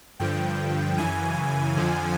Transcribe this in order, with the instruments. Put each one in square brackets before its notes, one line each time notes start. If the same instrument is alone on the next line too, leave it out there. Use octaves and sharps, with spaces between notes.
[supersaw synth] G2 D3 F3 G5
F#2 C#3 E3 G#5
F2 D3 F3